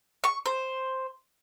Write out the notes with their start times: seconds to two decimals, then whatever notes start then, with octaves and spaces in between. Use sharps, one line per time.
0.24 C#6
0.46 C5